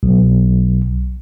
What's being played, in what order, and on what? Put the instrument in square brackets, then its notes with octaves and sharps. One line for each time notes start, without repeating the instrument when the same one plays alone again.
[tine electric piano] B1